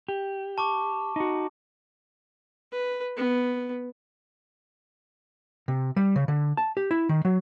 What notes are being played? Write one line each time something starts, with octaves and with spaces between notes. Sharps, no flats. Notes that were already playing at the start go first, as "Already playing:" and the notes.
G4
A5 C#6 D6
D#4 F#4
B4
B3
C3
G3
C#3
D3
A5
G4
E4
D#3
F#3